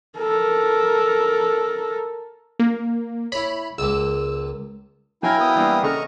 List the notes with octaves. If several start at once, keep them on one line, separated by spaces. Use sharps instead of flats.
A4 A#4
A#3
E4 C#5 B5
C#2 A#3 E6
F#3 E4 A#4 F5 G5 G#5
B3 D#6
E3 G3 A#3
C#3 A4 D#5 A#5 C#6 F6